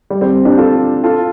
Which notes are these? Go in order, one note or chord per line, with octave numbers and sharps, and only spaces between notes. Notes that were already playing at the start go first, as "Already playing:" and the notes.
G3
G3 C4
D4 G4
F4 A4
F4 A4